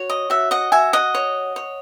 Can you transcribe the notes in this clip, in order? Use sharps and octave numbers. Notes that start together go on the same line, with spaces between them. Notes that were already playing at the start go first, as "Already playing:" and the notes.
Already playing: F#4 C#5
D#5
F#4 E5
D#5 F#5
F#4 E5 G#5
D#5 F#5
C#5
C#5